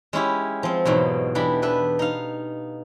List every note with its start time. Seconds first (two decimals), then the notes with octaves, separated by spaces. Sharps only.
0.13 G#3 C#4 E4 G4
0.63 F3 C4
0.85 E2 G#2 B2 F#3
1.35 E3 D4 G4 A4 G5 B5
1.62 B3 D4 B4 E5
1.99 D#4 F5